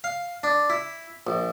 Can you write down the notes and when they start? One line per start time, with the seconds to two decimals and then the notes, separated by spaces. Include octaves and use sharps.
0.04 F5
0.43 D4
0.70 E4
1.27 A#1